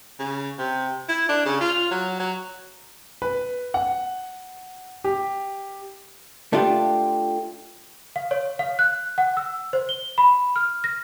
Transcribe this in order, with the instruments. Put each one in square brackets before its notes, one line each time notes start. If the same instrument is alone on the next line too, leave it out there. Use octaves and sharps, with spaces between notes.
[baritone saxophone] C#3
C3
E4
D4
C#3
F4
F#3
F#3
[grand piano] B4
F#5
G4
[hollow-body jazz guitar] A3 D4 F4 G4
[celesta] F5
C#5
F5
F#6
F#5
E6
C5
G7
B5
F6
A#6